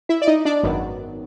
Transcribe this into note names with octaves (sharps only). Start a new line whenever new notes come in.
E4 E5
D5
D#4 D#5
D4 D5
G#1 F#2 D#3 F#3 B3